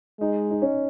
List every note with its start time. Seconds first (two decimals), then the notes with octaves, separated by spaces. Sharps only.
0.20 G#3 D#4
0.51 D#4
0.62 C#4